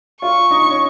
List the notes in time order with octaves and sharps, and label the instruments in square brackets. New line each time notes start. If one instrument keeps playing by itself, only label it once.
[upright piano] F4 [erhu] C#6
[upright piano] D#4
C#4